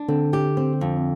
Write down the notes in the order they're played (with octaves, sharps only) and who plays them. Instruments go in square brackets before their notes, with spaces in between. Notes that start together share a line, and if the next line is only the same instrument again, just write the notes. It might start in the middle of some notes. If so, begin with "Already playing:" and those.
Already playing: [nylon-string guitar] D4
[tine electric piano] D3 [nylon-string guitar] C4
[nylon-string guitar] G4
C4
F2